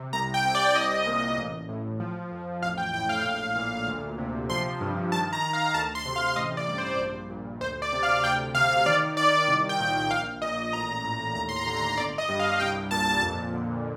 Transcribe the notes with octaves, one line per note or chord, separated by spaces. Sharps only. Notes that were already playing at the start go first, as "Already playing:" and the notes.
Already playing: C3
C2 A#5
G5
C3
D5
C2 D#5
A#2
A1
A2
F3
F2
A1 F5
G5
A2 G5
F5
A#1
A#2
D2
C3
F3 C6
G2
D#3 A5
A#5
D#3
F5
D2 A5
C6
C3
F5
A1 D#5
D5
G2
C5
A#1
A#2
D2 C5
D5
C3
F5
D2 G5
C3 F5
D#3 D5
D#3 D5
C2 D5
G5
A#2
G5
A#1 F5
A#2 D#5
A1 A#5
A2
D#2 A#5
C6
A#5
D3
A#5
G1 D5
D#5
G2
F5
C2 G5
A#2 A5
F2
D3